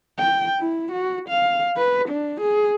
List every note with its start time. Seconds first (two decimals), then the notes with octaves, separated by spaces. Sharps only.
0.18 G5
0.59 E4
0.92 F#4
1.29 F5
1.77 B4
2.09 D4
2.40 G#4